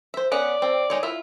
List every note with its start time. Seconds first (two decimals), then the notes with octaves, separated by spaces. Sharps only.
0.14 C5 E5
0.32 B3 C#4 D5 F#5
0.62 C4 A4
0.90 G#3 D#4 C#5
1.03 E4 F4 E5